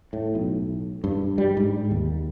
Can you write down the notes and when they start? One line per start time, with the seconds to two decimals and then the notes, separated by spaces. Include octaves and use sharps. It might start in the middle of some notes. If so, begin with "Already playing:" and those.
0.13 A2
0.35 B1
1.04 G2
1.38 G3
1.57 G#2
1.91 D#2